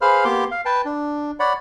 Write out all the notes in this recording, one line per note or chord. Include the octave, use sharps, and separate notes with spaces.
G#4 B4 C5 F5 B5 F6
A#3 B3 G4 C6 D6
F5
B4 G5 A5
D4
C#5 D5 F#5 B5